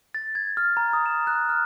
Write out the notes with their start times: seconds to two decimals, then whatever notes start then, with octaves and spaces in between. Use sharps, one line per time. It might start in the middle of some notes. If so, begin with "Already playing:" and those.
0.15 A6
0.35 G#6
0.57 F6
0.77 A#5
0.93 D#6
1.06 E7
1.27 F#6
1.49 F6